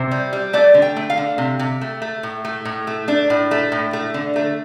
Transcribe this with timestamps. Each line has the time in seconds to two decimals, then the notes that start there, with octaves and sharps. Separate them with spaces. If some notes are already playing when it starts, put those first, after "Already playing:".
Already playing: C3 C5
0.11 G3
0.33 G3
0.53 A3 D5
0.74 D3
0.82 G5
0.96 A3
1.10 F5
1.18 D3
1.38 C3
1.59 C3
1.81 A3
2.02 A3
2.23 A2
2.45 A3
2.65 A2
2.87 A3
3.08 A3 D4
3.30 A2
3.51 A3
3.72 A2
3.93 A3
4.14 D3
4.36 A3